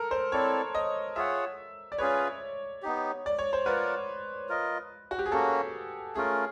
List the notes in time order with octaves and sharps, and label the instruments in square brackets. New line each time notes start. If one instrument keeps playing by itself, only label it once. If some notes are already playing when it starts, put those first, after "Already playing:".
Already playing: [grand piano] A4 A#4
C5
[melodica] C4 E4 A4 D5 [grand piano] C#5
[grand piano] D#5
[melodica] F4 G#4 C#5 F#5 [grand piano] E5
[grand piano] D5
[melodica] C#4 F4 G#4 B4 [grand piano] C#5
[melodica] B3 D#4 G4
[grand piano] D5
C#5
C5
[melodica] F4 A#4 D5 F#5 [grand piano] B4
[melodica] F4 A#4 D#5
[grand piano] F#4
G4
G#4
[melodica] A#3 C#4 F#4 [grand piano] A4
[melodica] A3 C#4 F4 A#4 [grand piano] G#4